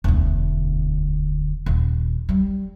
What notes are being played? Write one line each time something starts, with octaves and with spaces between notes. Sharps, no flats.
E1 D2
D#1
G3